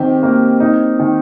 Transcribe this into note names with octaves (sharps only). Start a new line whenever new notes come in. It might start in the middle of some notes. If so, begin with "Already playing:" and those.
Already playing: D#3 C4 G4
A#3
D#4
D#3